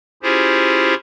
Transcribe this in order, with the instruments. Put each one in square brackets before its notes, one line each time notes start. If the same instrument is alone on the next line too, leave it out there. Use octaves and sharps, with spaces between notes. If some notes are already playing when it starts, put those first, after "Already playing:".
[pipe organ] C#4 E4 F4 G4 G#4 C5